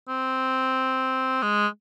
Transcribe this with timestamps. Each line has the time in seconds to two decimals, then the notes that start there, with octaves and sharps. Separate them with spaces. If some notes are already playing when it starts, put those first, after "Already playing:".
0.08 C4
1.43 G#3